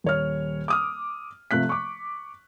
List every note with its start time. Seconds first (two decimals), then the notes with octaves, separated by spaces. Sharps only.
0.04 D#1 C#5 F6
0.68 D6 D#6 F6
1.51 C3 F3 A3 F#6 B6
1.69 C#6 D6